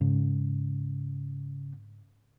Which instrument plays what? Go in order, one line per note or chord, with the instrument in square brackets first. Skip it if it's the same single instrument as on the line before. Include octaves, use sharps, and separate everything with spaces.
[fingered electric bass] G#2 [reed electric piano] C#3